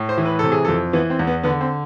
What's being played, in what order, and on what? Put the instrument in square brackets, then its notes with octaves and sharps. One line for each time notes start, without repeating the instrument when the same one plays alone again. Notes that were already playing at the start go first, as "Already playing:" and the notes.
Already playing: [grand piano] A2
C5
E3
B4
C3 A4
G#4
A4
F2
E3 B3
C4
E2
B3
D3 B3
C4